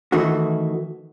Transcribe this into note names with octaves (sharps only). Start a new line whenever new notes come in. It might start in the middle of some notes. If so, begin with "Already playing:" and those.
D#3 E3 A3 F#4